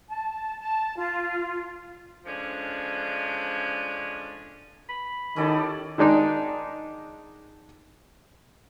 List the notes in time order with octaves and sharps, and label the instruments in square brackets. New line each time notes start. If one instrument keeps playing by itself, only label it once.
[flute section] A5
A5
F4
[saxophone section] D3 F3 G#3 C#4 D4
[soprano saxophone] B5
[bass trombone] D#3 [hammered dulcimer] C#4 E4 D5 [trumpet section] G4 A4 D#5
[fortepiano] D#3 G#3 D4 D#4